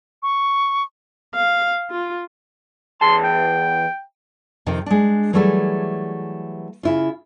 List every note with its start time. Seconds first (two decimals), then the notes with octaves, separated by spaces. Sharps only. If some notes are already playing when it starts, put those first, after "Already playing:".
0.23 C#6
1.35 F5
1.91 F4
3.01 E2 G#4 A5 C6
3.24 G5
4.66 F2 C3 D#3 D#4 G5
4.86 G#3 D4
5.33 E3 F#3 G3 A3 G#4 A4
6.83 C#3 E4 F4